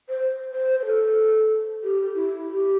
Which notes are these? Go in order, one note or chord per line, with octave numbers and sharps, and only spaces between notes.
C5
C5
C5
A4
G4
E4
G4